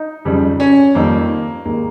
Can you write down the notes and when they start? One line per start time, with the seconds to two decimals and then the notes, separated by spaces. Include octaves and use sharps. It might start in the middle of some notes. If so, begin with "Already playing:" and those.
Already playing: D#4
0.25 F2 C#3 G3
0.60 C#4
0.95 F2 D#3 G3 A#3
1.65 D#2 D#3 G#3 A#3